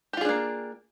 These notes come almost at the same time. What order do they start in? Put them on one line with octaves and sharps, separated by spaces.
G4 F4 G#4 D4 A#3